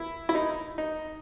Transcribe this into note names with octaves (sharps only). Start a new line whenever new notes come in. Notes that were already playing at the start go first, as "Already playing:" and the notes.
Already playing: E4
E4
D#4
D#4